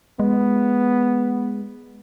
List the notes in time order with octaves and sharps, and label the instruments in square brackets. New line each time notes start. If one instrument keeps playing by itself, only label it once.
[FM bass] G#3 [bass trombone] B3